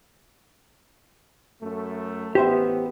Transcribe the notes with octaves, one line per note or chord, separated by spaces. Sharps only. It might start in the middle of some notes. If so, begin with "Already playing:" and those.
F#2 A3
A1 B3 G4 C5 E5